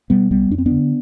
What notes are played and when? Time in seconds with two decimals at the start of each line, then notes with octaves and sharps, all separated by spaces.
0.10 B2 G3 B3
0.30 C2 G3 B3
0.50 F2 D4
0.58 C4
0.66 B3 D4
0.71 D3